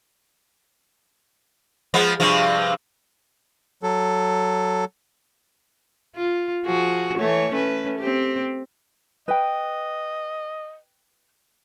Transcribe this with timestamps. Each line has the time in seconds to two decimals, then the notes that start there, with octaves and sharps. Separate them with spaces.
1.94 F3 G#3 B3
2.20 G2 C3 F3
3.83 F#3 A4
6.16 F4
6.66 F3 F#4 G#4
7.17 E3 A3 C#5
7.51 A3 C#4 B4
7.99 C4 G4
9.28 B4 D#5 G5